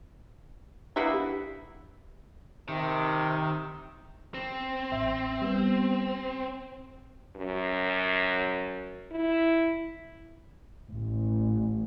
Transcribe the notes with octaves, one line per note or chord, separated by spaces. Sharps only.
A#3 B3 D4 E4 G4
C3 D#3
C4
A1 E5
G3 B3
F#2
E4
A1